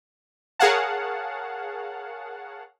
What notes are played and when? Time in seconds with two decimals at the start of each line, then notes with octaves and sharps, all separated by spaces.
0.59 G#4 A#4 C#5 F5 F#5 A5